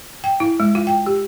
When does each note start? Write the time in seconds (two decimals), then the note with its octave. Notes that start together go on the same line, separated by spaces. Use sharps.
0.24 G5
0.40 E4
0.60 G#3
0.75 F4
0.87 G5
1.06 G4